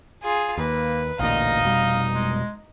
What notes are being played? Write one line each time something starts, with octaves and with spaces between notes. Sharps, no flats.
F4 G#4
D#2 A#3 B4
A1 D2 A#2 D#4 D#5 F5
F1 B2 G3
G#3